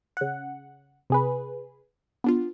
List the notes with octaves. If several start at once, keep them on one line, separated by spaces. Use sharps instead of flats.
C#3 F#5
C3 G#4 B4
B3 D4 F4